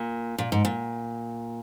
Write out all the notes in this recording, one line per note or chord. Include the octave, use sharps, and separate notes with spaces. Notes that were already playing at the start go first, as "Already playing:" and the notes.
Already playing: A#2
A#2
G#2
A#2